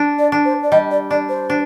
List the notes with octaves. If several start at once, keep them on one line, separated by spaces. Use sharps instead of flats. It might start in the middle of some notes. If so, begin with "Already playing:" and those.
Already playing: D4
D5
D4
C5
D5
G3 D#5
D5
D4 D5
C5
D4